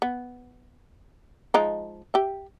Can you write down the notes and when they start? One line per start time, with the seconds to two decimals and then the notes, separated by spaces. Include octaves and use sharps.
0.02 B3
1.54 F3 G#3 D#4
2.14 G4 E5